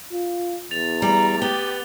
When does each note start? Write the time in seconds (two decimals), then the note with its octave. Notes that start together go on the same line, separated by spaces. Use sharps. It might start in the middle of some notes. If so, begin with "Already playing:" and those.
0.12 F4
0.71 E2 A6 F7
1.02 G3 A#5
1.42 B3 G4 G7